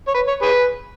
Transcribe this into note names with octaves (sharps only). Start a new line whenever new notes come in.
C#5
B4
C#5
G#4 B4